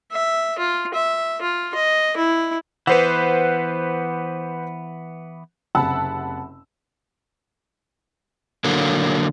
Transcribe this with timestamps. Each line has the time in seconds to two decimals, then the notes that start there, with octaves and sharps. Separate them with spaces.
0.12 E5
0.58 F4
0.94 E5
1.42 F4
1.75 D#5
2.17 E4
2.87 E3 B3 B4 C5 F#5
5.75 F#1 C3 F#5 A5 B5 E6
8.64 D3 F#3 A#3